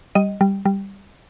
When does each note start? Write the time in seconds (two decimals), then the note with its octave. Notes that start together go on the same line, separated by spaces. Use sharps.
0.15 G3 D#5
0.41 G3
0.65 G3